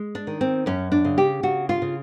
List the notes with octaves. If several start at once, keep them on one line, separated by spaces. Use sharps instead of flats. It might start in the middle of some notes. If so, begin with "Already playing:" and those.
Already playing: G#3
D4
D#3
C4
F#2 C#4
D4
C#3
G4
C#3 F#4
F4
C#3